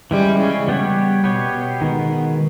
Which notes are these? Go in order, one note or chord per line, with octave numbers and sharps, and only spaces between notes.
E3 G3 G#3 C#4 E4
C#3
G3 B3 G4 C#5
B2 B3 G4 C#5
B2
D#3 G#3 B3